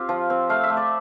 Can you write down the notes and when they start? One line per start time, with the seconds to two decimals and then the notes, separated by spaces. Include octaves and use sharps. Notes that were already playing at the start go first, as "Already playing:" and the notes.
Already playing: C4 F4 G4
0.09 F3
0.30 C4
0.49 A3 F5
0.63 E5
0.70 A3
0.77 D5